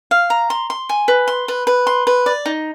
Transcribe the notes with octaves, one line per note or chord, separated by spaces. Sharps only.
F5
A#5
C6
C6
G#5
B4
C6
B4
B4
C6
B4
D5
D#4